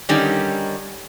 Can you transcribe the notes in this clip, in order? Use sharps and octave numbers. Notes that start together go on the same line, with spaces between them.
D3 D#3 G3 C#4 D#4